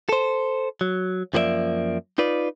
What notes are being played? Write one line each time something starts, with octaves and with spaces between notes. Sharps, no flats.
A4 C5
F#3
F#2 F3 A#3 F#4 D5 E5
D#4 F4 B4 D5